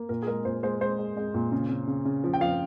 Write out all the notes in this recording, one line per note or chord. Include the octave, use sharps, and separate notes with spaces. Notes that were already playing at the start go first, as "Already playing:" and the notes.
Already playing: A#3
A#2 A#4
G#4
G#3 A#4
A#2 C5
G#3 C5
G#3 C5
G#3
G#3
A#2
C#3
C#3
C#3
C#3
F3
G5
F3 F5